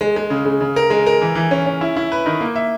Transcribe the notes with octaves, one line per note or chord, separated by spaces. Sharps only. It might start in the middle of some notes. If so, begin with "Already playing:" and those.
G#3
G#3
C#3
C#3
C#3
A#4
G#3
A#4
E3
E3
C#4
C#4
E4
E4
B4
D#3
A#3
E5